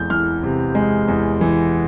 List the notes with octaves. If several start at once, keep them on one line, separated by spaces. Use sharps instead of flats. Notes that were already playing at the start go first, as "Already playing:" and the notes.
Already playing: E2 G#3 G6
E3 F6
C3
G#3
E2
E3